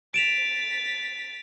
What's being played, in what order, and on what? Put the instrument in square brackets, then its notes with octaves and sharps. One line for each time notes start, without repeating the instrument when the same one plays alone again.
[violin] A6 B6 [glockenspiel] D7 E7 F7